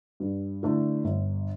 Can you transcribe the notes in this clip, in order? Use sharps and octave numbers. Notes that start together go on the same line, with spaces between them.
G2
D3 A3 E4
G1